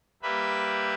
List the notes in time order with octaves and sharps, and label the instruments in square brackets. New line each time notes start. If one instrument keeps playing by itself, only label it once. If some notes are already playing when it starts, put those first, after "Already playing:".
[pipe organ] G3 A#3 G4 B4 E5 B5